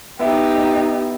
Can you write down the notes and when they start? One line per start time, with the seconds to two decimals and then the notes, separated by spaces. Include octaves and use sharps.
0.20 B3 D#4 E4 G4